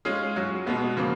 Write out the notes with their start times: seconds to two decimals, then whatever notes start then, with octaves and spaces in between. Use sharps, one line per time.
0.05 G#3 C#4 F4 G#4
0.36 F#3 C#4 F#4
0.66 B2 G#3 B3 F#4
0.97 C#3 F3 A#3